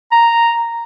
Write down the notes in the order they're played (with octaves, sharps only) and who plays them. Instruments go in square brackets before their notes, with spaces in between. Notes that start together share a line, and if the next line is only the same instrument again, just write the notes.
[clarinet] A#5